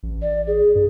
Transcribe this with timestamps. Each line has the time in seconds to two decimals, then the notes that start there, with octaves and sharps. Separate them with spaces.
0.03 A1
0.22 D5
0.47 G#4
0.75 G2